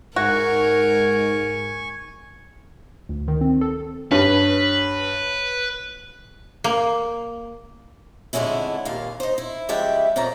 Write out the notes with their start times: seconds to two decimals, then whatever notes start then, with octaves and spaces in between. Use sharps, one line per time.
0.16 G#2 F#4 A#4 G#5 C#6
3.09 D2
3.28 D#3
3.41 C4
3.61 A4
4.11 G2 B4 C#5
6.64 A#3
8.33 F2 D3 G#3 A3 C#4 E4
8.85 D#2 A#2 F5
9.20 D#4 C5
9.38 E4
9.69 C#3 F3 G3 G#3 E5 G5
10.16 F2 A#2 F3 C#4 A#5